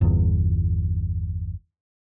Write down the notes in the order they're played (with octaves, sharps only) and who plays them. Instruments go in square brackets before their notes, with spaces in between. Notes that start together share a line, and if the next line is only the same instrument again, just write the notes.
[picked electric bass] G1 E2